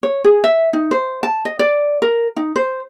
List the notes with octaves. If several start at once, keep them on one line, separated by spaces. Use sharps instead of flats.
C#5
G#4
E5
D#4
C5
A5
D#5
D5
A#4
D#4
C5